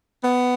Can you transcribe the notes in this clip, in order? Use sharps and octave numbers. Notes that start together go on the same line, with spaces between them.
B3